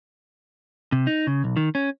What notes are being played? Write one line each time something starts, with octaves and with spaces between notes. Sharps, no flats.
C3
D#4
C#3
B1
D#3
C#4